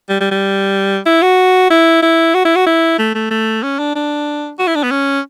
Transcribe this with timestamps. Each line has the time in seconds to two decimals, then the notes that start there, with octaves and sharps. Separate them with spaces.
0.09 G3
0.20 G3
0.31 G3
1.06 E4
1.22 F#4
1.70 E4
2.02 E4
2.34 F#4
2.45 E4
2.56 F#4
2.66 E4
2.99 A3
3.15 A3
3.31 A3
3.63 C#4
3.79 D4
3.95 D4
4.59 F#4
4.67 E4
4.75 D4
4.83 B3
4.91 C#4